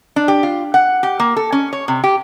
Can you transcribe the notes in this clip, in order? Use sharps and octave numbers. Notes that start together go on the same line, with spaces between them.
D4
G4
F4
F#5
G4
A#3
A4
C#4
C#5
C3
G4